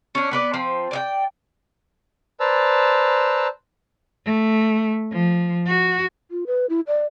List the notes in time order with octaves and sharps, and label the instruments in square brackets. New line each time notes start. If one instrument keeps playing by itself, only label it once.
[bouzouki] C#4 D4
B3 B4 D5
F3 C4
D5 D#5 G5
[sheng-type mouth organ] B4 C5 D5 A5 A#5 E6
[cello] A3
F3
F#4
[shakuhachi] F4
B4
E4
D5